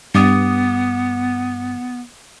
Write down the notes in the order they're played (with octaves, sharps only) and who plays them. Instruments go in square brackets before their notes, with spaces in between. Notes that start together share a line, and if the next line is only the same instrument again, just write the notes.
[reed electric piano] G2 D6 D#6 [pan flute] B3